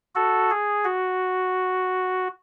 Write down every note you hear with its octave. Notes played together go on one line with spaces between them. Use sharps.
F#4 A4
G#4
F#4